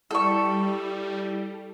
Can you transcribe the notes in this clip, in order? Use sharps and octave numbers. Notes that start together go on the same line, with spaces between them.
G3 E4 A4 C#6